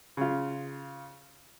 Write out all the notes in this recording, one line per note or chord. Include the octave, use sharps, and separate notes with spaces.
C#3 F4